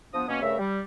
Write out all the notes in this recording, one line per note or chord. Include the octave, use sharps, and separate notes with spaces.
F3 B3 D4 D#6
B2 A#3 C#4
G2 C#3 A3 A#4 E5
G3